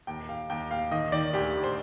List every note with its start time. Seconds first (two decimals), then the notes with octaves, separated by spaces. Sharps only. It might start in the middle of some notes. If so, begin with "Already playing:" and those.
0.07 D#2 G5
0.29 D#2 F5
0.50 D#2 G5
0.71 D#2 F5
0.91 D#3 D#5
1.12 D#3 D5
1.33 D2 G4
1.54 D2
1.64 C5